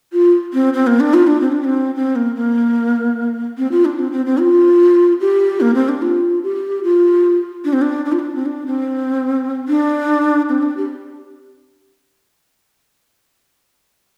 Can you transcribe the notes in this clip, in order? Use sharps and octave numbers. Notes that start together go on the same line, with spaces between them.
F4
C4
C4
A#3
D4
F4
D4
C4
D4
C4
C4
A#3
A#3
C4
F4
D4
C4
C4
C4
F4
G4
A#3
C4
D4
F4
G4
F4
D4
C4
D4
D4
F4
D4
C4
D4
C4
D4
C4
D4
G4